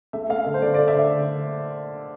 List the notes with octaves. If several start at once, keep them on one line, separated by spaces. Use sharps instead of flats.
A3 E5
A3 F5
D3
C5
A3 D5
D3 D5
E5
D3